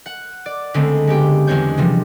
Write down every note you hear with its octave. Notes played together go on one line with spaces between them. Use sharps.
F#5
D5
C#2 D3 G#3 A3 C4
G#3 B3 G4 G5
E2 G#3 C4 D4 C#5 G6
C3 E3 F3 G3